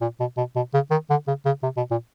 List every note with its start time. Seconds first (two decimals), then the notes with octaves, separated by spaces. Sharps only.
0.01 A#2
0.20 B2
0.37 B2
0.56 B2
0.74 C#3
0.91 D#3
1.10 D3
1.27 C#3
1.46 C#3
1.63 C3
1.77 B2
1.91 A#2